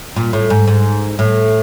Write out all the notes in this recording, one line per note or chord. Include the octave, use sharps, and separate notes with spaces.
A#2
A2
G#2
G#2
A2